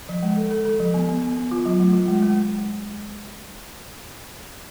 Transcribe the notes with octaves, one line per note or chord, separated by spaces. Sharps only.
F3
G#3
A4
A4
A4
F3
B3
B3
B3
B3
F4
F#3
A3
F4
G#3
G#3